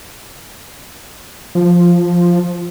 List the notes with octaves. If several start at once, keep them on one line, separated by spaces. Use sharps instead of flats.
F3